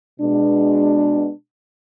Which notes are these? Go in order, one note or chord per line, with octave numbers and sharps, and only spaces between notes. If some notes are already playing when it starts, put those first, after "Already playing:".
B2 G#3 D4